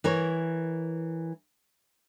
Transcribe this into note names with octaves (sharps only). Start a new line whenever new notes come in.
E3 A#4 C#5